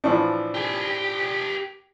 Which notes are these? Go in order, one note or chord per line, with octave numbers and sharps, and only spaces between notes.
A2 E3 F3 D4
G4 G#5